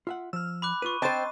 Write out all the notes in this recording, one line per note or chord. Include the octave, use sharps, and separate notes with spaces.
F4 E5 F#5
F3 E6 F6
B5 D6 F#6
F4 B4 C#6 D#7
C4 C5 D#5 A5 A6